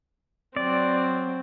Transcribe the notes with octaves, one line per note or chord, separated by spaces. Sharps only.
F#3 C4 D5